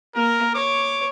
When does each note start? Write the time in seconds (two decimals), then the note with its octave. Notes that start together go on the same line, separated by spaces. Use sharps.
0.15 A#3 A#4
0.55 C#5 D6